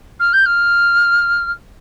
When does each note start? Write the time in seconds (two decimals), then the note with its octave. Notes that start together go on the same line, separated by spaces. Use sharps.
0.20 F6
0.33 G6
0.46 F6